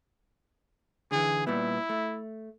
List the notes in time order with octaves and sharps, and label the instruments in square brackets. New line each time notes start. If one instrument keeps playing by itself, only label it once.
[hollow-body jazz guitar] D3 E3 [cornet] G#4
[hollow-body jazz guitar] A#2 G3 B3 [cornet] E4
[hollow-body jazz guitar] A3